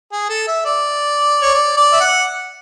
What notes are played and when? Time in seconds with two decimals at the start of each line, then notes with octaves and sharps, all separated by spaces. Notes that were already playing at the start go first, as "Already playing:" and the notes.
0.12 G#4
0.29 A4
0.48 E5
0.65 D5
1.42 C#5
1.54 D5
1.77 D5
1.92 E5
2.00 F#5